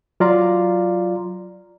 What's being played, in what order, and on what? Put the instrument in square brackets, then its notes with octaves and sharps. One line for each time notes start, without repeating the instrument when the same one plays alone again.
[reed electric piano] F#3 F4 D5 F5 A#5 C6